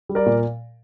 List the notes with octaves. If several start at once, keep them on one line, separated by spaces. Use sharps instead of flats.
G3
A#4 D5
A#2